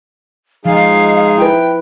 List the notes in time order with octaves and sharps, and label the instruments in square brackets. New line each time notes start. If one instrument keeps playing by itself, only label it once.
[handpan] F3 [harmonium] G#3 D#4 G#4 [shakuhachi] F5
[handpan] E4 B4 [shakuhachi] G5